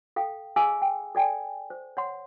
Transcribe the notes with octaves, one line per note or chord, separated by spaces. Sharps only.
A4 F5 G5
G#4 D#5 F5 G#5 D#6 E6
G5
A4 D5 G5 G#5
C5
C#5 F#5 C6